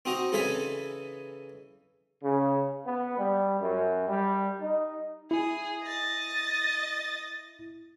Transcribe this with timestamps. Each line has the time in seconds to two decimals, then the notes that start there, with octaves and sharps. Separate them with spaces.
0.05 C4 D#4 F#4 D#5 A#5
0.32 C#3 E3 D#4 A4 E5 G#5
2.24 C#3
2.86 B3
3.17 G3
3.61 F#2
4.08 G3
4.60 D#4
5.31 E4 G#4
5.83 D#5 A6